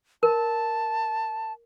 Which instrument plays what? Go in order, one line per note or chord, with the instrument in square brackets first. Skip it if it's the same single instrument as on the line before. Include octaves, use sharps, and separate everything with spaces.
[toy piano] A#4 [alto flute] A5